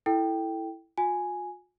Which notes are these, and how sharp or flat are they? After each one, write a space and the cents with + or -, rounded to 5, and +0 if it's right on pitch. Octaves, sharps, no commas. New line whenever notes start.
E4 +0 A4 +0 G5 +0
F4 +45 G#5 +0